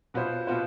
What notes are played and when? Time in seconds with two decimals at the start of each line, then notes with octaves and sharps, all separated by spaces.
0.14 B2 B3 F4 C5
0.47 B2 B3 F4 C5